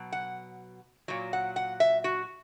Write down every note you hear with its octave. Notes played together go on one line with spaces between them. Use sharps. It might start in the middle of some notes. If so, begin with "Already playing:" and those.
Already playing: B2 F#3
F#5
A#2 F#3
F#5
F#5
E5
F#4